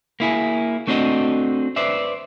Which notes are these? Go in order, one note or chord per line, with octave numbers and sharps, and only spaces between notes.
A#3 E4 G#4
A3 C4 D4 F#4 B4 D#5
B4 C5 D5 E5